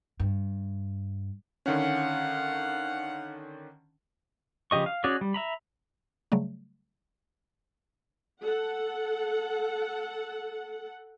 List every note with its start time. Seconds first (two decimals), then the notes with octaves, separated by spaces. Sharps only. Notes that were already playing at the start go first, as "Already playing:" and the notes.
0.20 G2
1.66 D3 D#3 C#4 F5 F#5
4.71 C#3 F3 G4 D#5 C#6
4.86 F5
5.04 C#4 F#4 G#4 D5
5.21 G3
5.34 E5 A#5 B5
6.32 C#3 F#3 G3 A3
8.43 A4 F#5